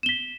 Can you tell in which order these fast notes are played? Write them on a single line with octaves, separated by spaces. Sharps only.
E7 G7 B6